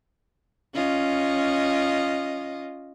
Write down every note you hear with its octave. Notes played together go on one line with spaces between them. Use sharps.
C#4 F4 D#5